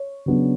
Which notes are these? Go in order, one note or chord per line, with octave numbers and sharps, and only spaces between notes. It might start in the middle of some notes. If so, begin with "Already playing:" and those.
Already playing: C#5
C#3 F#3 B3 D4